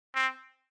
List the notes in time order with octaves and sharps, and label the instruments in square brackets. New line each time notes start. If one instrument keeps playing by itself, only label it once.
[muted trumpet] C4